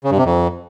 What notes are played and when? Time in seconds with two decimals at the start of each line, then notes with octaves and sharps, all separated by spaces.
0.04 C#3
0.11 G2
0.18 C3
0.25 F2